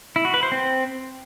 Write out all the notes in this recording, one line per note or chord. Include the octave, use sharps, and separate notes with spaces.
E4
F#4
B4
C5
C4